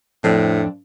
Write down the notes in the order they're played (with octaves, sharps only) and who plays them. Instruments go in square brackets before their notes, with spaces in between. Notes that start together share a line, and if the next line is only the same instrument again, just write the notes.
[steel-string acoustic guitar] F2 C4 D4 [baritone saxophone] A2